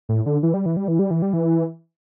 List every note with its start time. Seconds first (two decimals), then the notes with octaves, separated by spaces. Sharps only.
0.09 A2
0.26 D3
0.43 E3
0.54 G3
0.66 E3
0.77 G3
0.88 E3
0.99 G3
1.11 E3
1.22 G3
1.33 E3